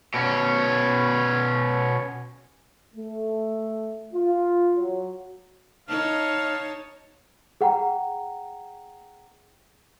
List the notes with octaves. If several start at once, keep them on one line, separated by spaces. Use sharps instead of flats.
B2 C#4
A3
F4
F#3
D#4 C#5 F5 A5
G#4 F#5 G5 A#5